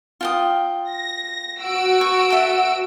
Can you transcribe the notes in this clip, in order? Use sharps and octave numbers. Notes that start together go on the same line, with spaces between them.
F4 G5 D#6
A#6
F#4 E6 D7
C#6
A4 E5